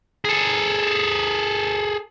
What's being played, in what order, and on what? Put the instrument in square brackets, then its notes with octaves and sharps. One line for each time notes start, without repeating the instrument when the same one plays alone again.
[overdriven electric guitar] G#4 A4